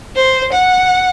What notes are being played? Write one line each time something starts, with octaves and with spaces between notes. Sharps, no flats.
C5
F#5